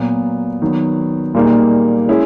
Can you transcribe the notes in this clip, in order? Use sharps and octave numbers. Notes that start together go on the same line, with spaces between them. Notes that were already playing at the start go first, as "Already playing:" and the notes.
Already playing: A#2 F#3 B3
D#3 F#3 B3
A#2 G3 A#3 D#4 G#4
G#3 C#4 E4 G#4